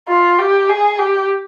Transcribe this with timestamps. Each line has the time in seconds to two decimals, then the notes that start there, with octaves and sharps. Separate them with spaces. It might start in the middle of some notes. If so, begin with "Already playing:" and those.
0.09 F4
0.38 G4
0.69 G#4
0.99 G4